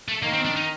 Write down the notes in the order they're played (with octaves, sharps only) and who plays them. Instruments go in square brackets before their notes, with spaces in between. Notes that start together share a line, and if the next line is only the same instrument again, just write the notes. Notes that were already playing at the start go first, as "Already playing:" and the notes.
[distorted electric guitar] A3
[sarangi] D#3 [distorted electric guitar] A#3
[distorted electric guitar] C4
D4
D#4